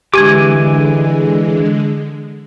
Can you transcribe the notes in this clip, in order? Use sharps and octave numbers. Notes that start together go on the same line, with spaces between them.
D3 E3 G#3 G4 G#5 D6 G#6